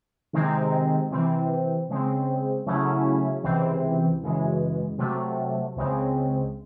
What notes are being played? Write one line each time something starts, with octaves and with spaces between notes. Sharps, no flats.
C3 D#3 G#3 C4 D#4
C3 E3 C4
C#3 G#3 C4
C#3 F#3 A3 C#4 E4
C#2 C3 E3 C4
F#2 C#3 E3 G#3
C3 F#3 A3
C#2 C#3 G#3 C4